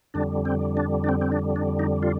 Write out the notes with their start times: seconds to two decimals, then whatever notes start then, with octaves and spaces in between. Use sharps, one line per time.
0.14 F2 D3 G3 D4
0.45 C4
0.77 D4
1.04 D4
1.09 C4
1.21 C4
1.32 D4
1.56 D4
1.79 D#4
2.03 F4